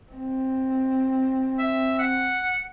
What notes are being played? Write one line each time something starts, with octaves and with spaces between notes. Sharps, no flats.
C4
E5
F#5